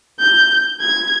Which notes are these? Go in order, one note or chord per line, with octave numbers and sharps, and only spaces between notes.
G6
G#6